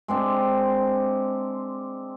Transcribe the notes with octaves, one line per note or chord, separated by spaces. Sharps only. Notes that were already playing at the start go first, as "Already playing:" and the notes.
G#3 C4 D4